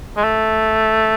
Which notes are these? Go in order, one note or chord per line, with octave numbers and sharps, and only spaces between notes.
G#3
A3